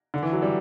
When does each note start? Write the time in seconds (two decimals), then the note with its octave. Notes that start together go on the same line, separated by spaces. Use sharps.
0.14 D3
0.23 E3
0.32 F#3
0.42 G3